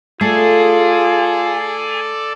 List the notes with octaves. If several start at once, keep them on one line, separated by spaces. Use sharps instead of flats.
A3 F4 G#4 A4 D5